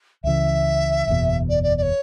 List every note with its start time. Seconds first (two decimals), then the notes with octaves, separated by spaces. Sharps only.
0.24 C#2 C#3 E3 E5
1.08 F#1 E2 B2
1.49 D5
1.63 D5
1.77 D5
1.82 C#5